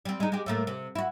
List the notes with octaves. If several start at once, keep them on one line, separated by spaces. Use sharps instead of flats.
G3 C4
G#3 D#4
G#3 G4
A2 A3 A#3
C3
E4 F#4